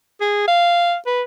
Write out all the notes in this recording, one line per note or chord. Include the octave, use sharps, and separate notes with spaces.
G#4
F5
B4